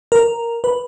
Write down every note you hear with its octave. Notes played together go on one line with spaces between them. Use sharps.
A#4
B4